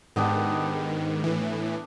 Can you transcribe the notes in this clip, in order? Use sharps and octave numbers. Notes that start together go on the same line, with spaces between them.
G#2 D#3 B3 D4 G4
A2 E3